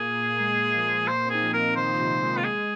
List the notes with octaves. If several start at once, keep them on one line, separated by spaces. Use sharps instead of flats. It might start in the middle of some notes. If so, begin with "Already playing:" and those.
Already playing: A#2 A#3 G#4
G#3
G#3
F3
G#3
A#2 A#3 C5
C4
D#4 G#4
F3 F4
A#4
D#3 D#4 C5
D#4
C3 C4
G#3
F3 F4
G#3 G#4